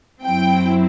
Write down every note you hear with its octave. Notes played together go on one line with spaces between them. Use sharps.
F#2 F#3 C4 E4 G5